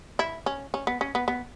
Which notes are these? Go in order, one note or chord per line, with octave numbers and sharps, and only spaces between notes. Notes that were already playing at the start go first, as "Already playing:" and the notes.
E4
C#4
C#4
B3
C#4
B3
B3